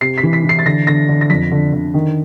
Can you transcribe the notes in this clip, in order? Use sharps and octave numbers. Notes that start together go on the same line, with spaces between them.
C3 C7
B6
E3
B6
E3
C7
A6
D3 A#6
D3 A#6
D3
A#6
F2 B6
D3
D3
D#3